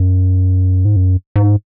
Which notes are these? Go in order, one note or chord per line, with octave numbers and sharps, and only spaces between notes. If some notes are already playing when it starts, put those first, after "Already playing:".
Already playing: F#2
G#2
F#2
G#2